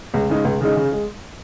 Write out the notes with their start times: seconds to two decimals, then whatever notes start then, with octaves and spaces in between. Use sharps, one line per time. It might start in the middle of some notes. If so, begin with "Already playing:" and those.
0.14 C#2
0.29 C#3 G#3 D#4
0.45 C#2
0.61 C#3 G#3 D#4
0.76 C#3
0.92 G#3